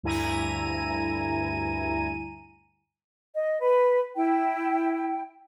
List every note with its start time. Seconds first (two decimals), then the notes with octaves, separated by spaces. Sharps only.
0.03 D2 G2 E4 G#5 A#5 D#7
3.33 D#5
3.61 B4
4.15 E4 G5